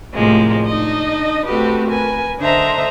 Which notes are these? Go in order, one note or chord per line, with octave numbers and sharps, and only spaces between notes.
A2 C3 F3 G#3 A#3
D4 D#4 D#5
A3 C4 F#4 G4 A4 B4
A#4 B4 G#5
D3 D4 C5 D#5 E5 A#5